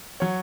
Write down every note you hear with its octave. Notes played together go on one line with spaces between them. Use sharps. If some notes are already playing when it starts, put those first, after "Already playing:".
F#3 C#5